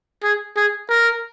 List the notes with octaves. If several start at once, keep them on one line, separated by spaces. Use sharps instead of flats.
G#4
G#4
A#4